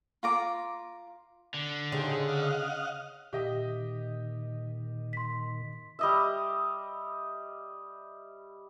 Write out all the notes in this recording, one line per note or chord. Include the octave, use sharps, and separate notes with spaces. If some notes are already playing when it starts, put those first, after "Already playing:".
F4 A#5 D6
D3
C#3 D#4 G4 C5
D#5 F5 F#5
A#2 D#3 G4 D#5 E5
C6 B6
G3 D#5 E5